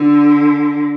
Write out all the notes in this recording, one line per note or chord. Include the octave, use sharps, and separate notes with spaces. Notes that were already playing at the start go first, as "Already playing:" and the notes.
Already playing: D3